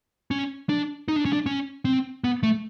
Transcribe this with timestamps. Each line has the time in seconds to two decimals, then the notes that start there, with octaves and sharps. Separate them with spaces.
0.31 C#4
0.69 D4
1.08 D#4
1.16 D4
1.25 C#4
1.33 D4
1.46 C#4
1.85 C4
2.24 B3
2.43 A3